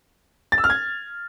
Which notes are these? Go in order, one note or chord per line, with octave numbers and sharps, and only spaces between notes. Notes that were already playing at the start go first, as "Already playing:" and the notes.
A6
E6
F6
G#6